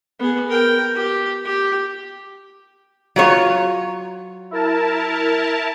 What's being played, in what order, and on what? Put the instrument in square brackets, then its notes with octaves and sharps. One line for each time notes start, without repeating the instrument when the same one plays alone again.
[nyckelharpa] B3 G#4
A#4 G5
G4
G4
[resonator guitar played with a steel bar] F#3 F4 C#5
[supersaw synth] E4 A#4 A5